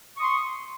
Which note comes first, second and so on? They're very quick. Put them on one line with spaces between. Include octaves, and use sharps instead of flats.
C#6 D#6 C6